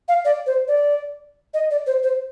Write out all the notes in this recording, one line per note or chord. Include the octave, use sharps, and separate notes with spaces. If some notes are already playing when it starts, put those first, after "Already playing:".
F5
D5
C5
D5
D#5
D5
C5
C5